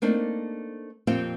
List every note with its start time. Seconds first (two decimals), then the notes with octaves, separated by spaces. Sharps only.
0.02 A3 A#3 C4 D4 D#4
1.07 F2 A#2 C4 G4 F5 G5